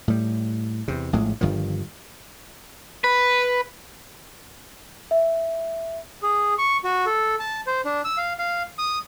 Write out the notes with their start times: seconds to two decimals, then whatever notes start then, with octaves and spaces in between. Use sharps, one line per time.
0.08 A2 G3
0.88 E2 C3
1.13 A#1 A2 G#3
1.41 G1 G2 D#3 F3
3.04 B4
5.11 E5
6.22 G#4
6.58 C#6
6.84 F#4
7.06 A4
7.40 A5
7.67 C5
7.85 D4
8.05 E6
8.18 F5
8.39 F5
8.78 D#6